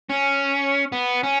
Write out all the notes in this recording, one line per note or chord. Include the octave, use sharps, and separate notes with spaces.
C#4
B3
C#4